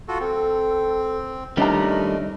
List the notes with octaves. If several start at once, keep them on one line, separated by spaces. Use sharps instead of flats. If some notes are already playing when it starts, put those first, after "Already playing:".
F4 F#4 A4
C4 A4
D#3 G3 A3 C#4 D4 D#5 A#5